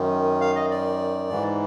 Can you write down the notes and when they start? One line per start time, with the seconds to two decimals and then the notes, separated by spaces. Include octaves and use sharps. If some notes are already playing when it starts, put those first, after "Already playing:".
Already playing: F#2 D#3
0.41 F5
0.56 D#5
0.71 D5
1.30 G#2 E3